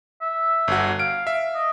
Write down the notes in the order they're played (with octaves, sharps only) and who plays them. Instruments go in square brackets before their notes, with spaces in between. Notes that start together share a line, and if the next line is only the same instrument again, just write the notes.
[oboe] E5
[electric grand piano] G1 F#4
[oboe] F5 [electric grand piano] D7
[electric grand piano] E5
[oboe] D#5